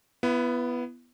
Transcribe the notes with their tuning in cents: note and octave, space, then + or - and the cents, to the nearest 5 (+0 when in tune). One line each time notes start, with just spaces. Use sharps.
B3 +0 E4 +35